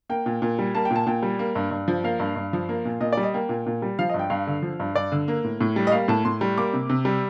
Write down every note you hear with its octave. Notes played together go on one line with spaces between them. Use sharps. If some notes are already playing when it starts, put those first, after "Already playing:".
A#3 G5
A#2
A#2
G3
A#3 A5
G5
A#2
A5
A#2 G5
G3
A#3
G2
G2
F3
A#3 F5
G2
G2
F3
A#3
A#2
A#2 D#5
G3 D5
D#5
A#3 G5
A#2
A#2
G3
F3 F5
G2 D#5
G5
G2 F5
D3
F3
G2
G2 D5
D3
A#3
A2
A2
G3
D#5
A#3 F5
A2 A5
A2 C6
G3
A#3 D6
C3
C3
G3